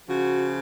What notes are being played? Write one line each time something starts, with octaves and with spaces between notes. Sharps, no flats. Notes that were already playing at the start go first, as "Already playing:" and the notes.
C#3 F3 F#4